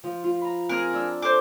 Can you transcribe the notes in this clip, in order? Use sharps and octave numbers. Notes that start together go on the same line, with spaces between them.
F3
F4
A#5 B5
C4 G#4 A#4
D4 E6 F#6
A4 C5 D6